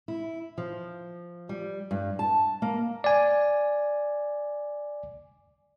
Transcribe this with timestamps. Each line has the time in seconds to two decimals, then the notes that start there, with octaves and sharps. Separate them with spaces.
0.08 E4
0.58 F3
1.49 G3
1.91 G2
2.19 A5
2.62 A#3
3.04 D5 G#5